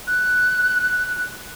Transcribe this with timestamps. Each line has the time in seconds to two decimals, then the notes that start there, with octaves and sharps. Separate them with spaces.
0.07 F#6